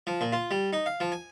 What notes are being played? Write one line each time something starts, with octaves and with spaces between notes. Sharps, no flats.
F3
A#2
F4
G3
D#4
F5
F3
G#5